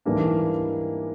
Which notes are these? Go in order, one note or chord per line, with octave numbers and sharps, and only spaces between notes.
G#2 E3 G3 A#3 D4